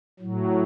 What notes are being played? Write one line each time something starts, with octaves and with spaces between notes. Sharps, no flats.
A2 F#3